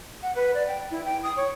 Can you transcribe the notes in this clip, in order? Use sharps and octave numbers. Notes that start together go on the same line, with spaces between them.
F#5
B4
D5
G5
E4
G5
D#6
C#5